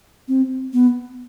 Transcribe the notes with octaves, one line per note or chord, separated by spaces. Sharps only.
C4
B3